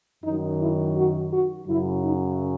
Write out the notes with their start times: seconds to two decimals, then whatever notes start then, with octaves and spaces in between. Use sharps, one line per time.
0.24 F#2 D#3 F#3 D#4
0.60 E4
0.96 F#4
1.32 F#4
1.68 F#2 C#3 F#3 E4
2.04 D#4